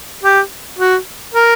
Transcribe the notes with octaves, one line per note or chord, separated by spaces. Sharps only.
G4
F#4
A#4